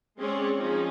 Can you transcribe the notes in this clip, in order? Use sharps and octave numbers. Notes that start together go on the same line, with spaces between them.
G#3 C4 C#4 G#4 C#5 D5
F3 C4 C#4 D#4 G#4